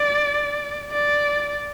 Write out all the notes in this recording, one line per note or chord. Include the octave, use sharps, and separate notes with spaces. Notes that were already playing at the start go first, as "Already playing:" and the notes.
Already playing: D5
D5